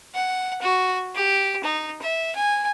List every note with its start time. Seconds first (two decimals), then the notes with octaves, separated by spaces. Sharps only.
0.14 F#5
0.61 F#4
1.14 G4
1.63 D#4
2.02 E5
2.35 G#5